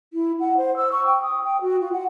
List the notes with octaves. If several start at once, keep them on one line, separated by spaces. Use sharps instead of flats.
E4
F#5
C5
E6
C#6
G5
D#6
G5
F#4
F4
F#5